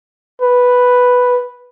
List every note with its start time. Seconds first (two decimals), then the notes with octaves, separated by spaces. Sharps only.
0.42 B4